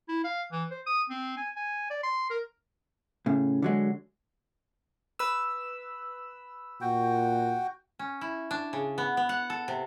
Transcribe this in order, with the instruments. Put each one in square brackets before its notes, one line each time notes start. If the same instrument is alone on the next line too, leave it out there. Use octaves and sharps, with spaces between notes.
[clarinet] E4
F5
E3
C5
D#6
C4
G#5
G#5
D5
C6
A#4
[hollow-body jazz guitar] A2 C#3
D3 F#3 G#3
[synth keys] B4 E6
[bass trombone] A#2 [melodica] F#4 G5
[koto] C#4
E4
D4
C#3
B3
B3
F#5
A4
C3